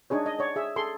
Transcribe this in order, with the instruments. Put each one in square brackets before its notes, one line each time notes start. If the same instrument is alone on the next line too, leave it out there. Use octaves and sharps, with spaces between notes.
[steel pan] D4 D#4 G#4 C#5
D#5
C#5 D5
G#4 E5
G#4 A4 C6